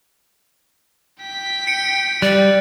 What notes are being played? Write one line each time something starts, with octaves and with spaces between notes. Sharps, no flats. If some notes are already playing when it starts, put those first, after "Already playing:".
G5 B6
C#7 D7
G3 D5 F#6